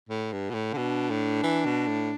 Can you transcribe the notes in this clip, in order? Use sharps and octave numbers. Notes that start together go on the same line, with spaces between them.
A2
G2
B2
A2
D3
B2 D4
A2
E3
B2
A2